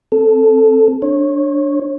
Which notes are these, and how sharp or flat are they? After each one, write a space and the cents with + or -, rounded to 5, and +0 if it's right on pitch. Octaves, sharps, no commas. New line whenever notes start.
C4 +15 A4 +0
D4 +0 C#5 -25